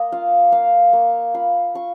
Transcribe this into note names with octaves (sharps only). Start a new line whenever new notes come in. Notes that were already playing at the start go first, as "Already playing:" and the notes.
Already playing: A#3 D#5
F4 F5
A#3 F5
A#3 C#6
F4 B5
F4 C#6